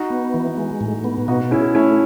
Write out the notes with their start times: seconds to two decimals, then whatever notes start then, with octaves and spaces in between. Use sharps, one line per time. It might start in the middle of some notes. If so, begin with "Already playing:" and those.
Already playing: D#4 F#4
0.10 B3
0.34 E3
0.57 G#3
0.81 A2
1.04 B3
1.28 B2 D#4 F#4
1.51 C#4 E4 G#4
1.75 A3 C#4 E4